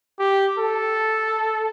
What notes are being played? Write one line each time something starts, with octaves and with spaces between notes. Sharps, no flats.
G4
A4